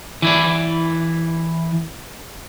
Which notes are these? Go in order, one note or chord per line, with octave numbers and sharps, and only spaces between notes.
E3 E4 D5